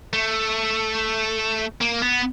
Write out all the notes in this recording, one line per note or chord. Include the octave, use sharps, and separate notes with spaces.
A3
A#3
B3